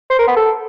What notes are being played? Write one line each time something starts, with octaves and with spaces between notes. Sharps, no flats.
C5
A#4
B3
A4